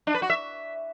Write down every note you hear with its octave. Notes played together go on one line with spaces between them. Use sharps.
D4
B4
F#4
E5